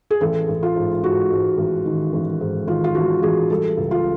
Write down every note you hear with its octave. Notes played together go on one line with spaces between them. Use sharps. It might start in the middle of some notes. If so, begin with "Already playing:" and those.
G#4
A1 A4
A1
F4
G#2
G#2 F#4
G#2
A1
D#3
A1
G#2
D#3 F4
F4
A1 F#4
A1 G#4
G3 A4
C#2
F4